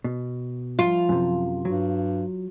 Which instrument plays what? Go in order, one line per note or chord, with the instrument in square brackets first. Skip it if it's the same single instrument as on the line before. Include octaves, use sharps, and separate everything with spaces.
[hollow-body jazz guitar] B2
[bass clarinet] F3 [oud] F4
[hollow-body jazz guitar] F#2 C3
[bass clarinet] G2 [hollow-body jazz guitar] F#3